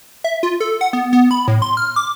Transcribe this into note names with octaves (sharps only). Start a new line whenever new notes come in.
E5
F4
A4
F#5
B3
B3
B5
A2
C6
F6
D6